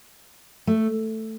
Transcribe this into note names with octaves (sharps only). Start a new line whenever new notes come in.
A3